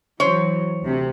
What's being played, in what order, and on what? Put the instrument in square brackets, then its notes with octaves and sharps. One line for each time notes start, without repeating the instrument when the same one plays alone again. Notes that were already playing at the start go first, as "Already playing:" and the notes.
[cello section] E3 F#3 [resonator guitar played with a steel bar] C5 C#5
[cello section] D2 C3